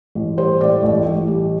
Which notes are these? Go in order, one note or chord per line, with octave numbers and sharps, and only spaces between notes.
A1
G3 C5
A2 D5
A1
A1
G3